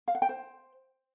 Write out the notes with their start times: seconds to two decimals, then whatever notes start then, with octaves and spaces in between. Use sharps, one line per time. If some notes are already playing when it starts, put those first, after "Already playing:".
0.08 F5
0.15 F#5
0.22 G5
0.29 C5